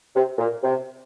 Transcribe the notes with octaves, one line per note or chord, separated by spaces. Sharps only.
C3
A#2
C3